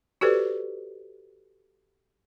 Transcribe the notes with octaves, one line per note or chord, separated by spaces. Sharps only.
F#4 G4 A4 B4 C5 D5